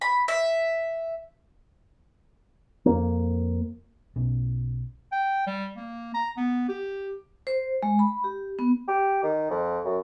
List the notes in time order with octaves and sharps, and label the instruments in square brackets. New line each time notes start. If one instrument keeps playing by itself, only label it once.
[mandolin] B5
E5
[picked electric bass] F2 A#3
[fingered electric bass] B1 B2 C#4
[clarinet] G5
G3
A#3
A#5
B3
G4
[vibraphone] C5
G#3
B5
G4
B3
[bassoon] G4
D#3
F2
F#2